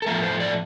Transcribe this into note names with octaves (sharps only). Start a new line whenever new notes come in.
A4
A2 F3 A3 A#4
C5
D5